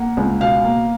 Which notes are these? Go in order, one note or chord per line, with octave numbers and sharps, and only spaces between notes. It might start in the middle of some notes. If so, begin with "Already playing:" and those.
Already playing: A#3 F#5
C#2
B2 F5
A#3